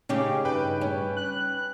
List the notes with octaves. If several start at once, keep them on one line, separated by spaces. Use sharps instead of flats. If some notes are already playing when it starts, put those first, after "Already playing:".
C#3 C#4 D#4 G4
G2 B4 G5
C#4
F#6